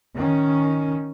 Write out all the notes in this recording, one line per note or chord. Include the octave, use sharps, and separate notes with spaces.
D#3 C#4